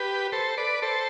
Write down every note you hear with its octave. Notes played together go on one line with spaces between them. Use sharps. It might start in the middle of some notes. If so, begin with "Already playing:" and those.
Already playing: G4 B4
A4 C5
B4 D5
A4 C5